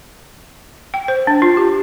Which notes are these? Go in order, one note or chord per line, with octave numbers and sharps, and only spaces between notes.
G5
C5
D4
F4
G4